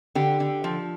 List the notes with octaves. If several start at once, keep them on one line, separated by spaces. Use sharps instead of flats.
D3 G4
D3
F3